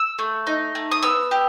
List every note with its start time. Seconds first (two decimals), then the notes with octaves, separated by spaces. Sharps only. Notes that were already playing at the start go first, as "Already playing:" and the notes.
Already playing: E6
0.19 A3
0.47 D#4
0.75 A3
0.92 D#6
1.03 B3 E6
1.31 G4